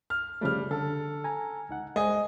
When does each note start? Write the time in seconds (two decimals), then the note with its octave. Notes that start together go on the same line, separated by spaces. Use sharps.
0.10 F6
0.41 C#3 F3 G3 A3 F6
0.71 D3 A4
1.24 G#5 A#5
1.69 C#2 D#4 F#5
1.96 G#3 C5 D#5 G#5